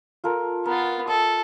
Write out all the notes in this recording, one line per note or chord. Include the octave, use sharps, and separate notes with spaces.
F4 A4 A#4
B3 F4 A#4
A4 D#5